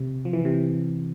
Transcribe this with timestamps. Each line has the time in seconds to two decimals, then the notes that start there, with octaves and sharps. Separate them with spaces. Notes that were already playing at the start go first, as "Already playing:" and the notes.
Already playing: C3
0.25 F3
0.33 E3
0.45 C3